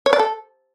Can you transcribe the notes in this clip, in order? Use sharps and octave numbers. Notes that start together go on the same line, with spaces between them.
C#5
D5
A4